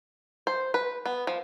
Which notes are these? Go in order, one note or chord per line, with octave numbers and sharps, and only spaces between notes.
C5
B4
B3
F3